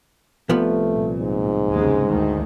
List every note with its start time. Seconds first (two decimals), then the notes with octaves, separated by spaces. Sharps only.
0.50 C2 F3 A3 B3
0.89 A#2
1.20 G#2
1.71 D#2 C#3 G#3
2.05 D2 D#3